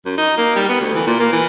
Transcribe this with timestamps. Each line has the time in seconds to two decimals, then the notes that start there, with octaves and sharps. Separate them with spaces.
0.05 F#2
0.18 D#4
0.38 A#3
0.55 G3
0.69 B3
0.80 D2
0.95 E3
1.07 A#2
1.19 A#3
1.32 E3